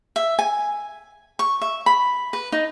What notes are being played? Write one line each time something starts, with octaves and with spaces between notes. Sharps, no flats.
E5
G#5
C#6
E5
B5
B4
D#4